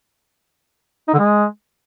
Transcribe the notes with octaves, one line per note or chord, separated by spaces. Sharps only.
D#4
D3
G#3